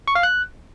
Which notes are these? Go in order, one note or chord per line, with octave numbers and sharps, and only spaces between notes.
C#6
F5
F#6